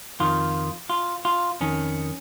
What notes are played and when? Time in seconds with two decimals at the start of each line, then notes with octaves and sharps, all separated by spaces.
0.20 F2 D#3 F4
0.90 F4
1.25 F4
1.61 F2 D#3 C#4